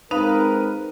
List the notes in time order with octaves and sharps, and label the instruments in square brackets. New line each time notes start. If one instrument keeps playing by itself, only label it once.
[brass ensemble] G#3 C4 A#4 [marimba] D#4 F5 [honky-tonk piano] B4